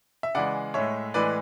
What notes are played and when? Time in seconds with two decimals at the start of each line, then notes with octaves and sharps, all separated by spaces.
0.23 E5
0.35 C#3 E3 G#3 D5 F#5
0.74 A2 G#3 C#5 E5
1.14 A2 E3 G#3 B4 D5